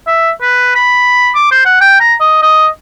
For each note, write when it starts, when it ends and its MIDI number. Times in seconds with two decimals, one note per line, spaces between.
0.07 0.31 76
0.41 0.74 71
0.75 1.30 83
1.35 1.48 86
1.51 1.63 72
1.65 1.76 78
1.81 1.98 79
2.00 2.14 82
2.20 2.41 75
2.42 2.67 75